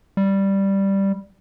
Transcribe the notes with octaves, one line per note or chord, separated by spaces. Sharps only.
G3